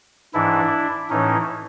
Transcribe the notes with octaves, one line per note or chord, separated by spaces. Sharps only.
G#2 E3 D4 E4
A2 E3 C#4 D#4